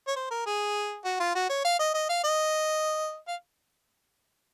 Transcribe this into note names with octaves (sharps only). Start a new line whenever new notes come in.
C#5
C5
A#4
G#4
F#4
F4
F#4
C#5
F5
D#5
D#5
F5
D#5
F5